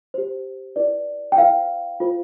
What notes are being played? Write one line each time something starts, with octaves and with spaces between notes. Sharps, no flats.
G4 C5
E4 B4 D5
G5
E4 A4 C5 F5
F4 A4 C5